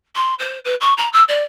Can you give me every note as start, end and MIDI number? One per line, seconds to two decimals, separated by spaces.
0.15 0.34 84
0.39 0.58 72
0.64 0.74 71
0.80 0.93 85
0.97 1.08 82
1.12 1.23 88
1.28 1.43 74